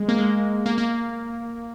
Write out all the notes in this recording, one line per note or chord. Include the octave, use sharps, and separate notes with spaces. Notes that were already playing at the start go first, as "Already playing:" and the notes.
Already playing: G#3
A#3
G#3
A#3
A#3